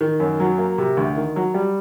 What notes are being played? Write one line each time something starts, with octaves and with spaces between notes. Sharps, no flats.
D#3
F#2
F#3
A#3
C3
D2
D#3
F#3
G3